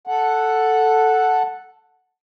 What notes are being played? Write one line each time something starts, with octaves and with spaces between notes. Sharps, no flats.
A4 F#5